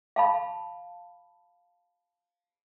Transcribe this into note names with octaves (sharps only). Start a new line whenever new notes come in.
F5 A5 B5